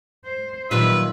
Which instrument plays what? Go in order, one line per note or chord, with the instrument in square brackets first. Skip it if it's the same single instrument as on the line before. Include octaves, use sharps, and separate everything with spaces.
[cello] C5
[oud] A#2 G3 F4 [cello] D#3 F#3 [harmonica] B4 E5